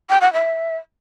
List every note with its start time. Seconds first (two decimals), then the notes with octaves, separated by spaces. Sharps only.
0.10 G5
0.21 F#5
0.33 E5